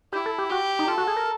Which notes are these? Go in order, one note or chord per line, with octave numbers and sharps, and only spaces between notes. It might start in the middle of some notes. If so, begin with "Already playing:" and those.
E4 G4
A4
G4
F#4 G4
D#4
F4 A4
F#4
G#4
A#4